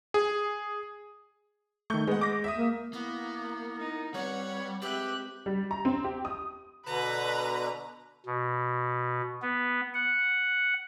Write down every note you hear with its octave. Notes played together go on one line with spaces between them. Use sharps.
G#4
D#3 A3 C#6 G6
G#3 B3 F#5
D6 A#6
E5 D#6
A#3
A#3 B3 E4 A#4
D#4
G3 C4 B4 C#5 F#5
G#3 C4 G4 B4 E5 F#6
G3
A#5
C4
G4
D#6
B2 D3 B4 A#5
B2
B3
F#5